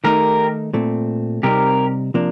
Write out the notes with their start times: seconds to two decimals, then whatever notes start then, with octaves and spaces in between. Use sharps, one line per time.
0.04 D#3 A3 D#4 G4 A#4
0.73 A#2 A3 C4
1.43 C3 G3 C4 D#4 G4 A#4
2.14 C3 F3 A#3 D4